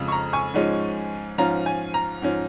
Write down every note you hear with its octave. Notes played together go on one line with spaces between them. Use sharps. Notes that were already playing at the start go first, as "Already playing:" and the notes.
Already playing: F2 C#3 G#3 F4
C#6
A#5
G#5 C#6
G#2 F3 G#3 C#4
G#2 F3 C#4 F4 A#5
G#5
A#5
G#2 F3 C#4